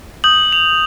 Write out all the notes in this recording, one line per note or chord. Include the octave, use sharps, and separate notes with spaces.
D#6 G6 F#7
F7